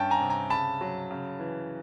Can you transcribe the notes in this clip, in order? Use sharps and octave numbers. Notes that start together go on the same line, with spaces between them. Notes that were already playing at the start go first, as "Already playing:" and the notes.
Already playing: G2 C#4 G5 A5
G#5 A#5
C3
G#5 A#5
C#3 A5 B5
F#3
C#3
E3